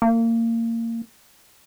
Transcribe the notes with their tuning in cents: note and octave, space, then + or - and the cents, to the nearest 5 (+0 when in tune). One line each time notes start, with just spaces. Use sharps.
A#3 -25